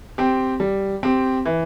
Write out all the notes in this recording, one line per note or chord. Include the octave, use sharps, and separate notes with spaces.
C4 G4
G3
C4 G4
E3